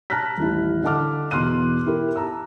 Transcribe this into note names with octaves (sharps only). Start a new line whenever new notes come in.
A5 A#5 F6 F#6 A#6 B6
D#1 A1 E4
D3 D#5 F#5 A5 D6 F6
E2 B2 C6 F6 F#6 D#7
E4 G4 A#4
A5 A#5 E6